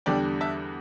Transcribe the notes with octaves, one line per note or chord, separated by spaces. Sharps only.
E2 D3 G3 D4 D5 G5
E5 A5